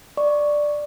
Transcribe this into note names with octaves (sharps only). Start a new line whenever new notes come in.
D5 C#6